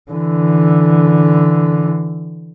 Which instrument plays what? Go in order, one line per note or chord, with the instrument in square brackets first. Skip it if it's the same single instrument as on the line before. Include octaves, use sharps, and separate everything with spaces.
[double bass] D3 E3